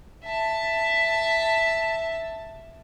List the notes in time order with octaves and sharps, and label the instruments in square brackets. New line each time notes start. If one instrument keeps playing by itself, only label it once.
[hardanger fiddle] E5 A5